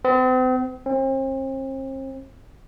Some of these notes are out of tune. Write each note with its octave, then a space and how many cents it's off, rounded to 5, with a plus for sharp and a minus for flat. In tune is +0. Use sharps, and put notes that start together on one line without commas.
C4 -40
C4 +40